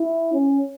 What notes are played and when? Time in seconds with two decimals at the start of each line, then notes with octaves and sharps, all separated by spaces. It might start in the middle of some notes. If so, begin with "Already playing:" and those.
Already playing: E4
0.33 C#4